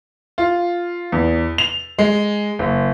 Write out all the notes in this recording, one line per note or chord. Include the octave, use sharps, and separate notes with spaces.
F4
E2
F7
G#3
F#1